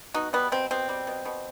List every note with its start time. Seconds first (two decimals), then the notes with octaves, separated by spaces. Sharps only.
0.14 B2 D#4 F#4
0.33 G3 B3
0.52 B2 C4
0.71 B2 C4
0.89 G3
1.07 B2
1.25 B2